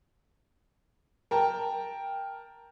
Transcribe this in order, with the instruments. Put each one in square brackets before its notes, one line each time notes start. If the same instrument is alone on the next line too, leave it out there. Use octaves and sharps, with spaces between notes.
[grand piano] A#4 G5 A5